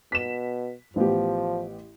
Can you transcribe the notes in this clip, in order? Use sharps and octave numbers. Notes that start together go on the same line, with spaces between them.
B2 B6 E7
A1 F3 B3 G4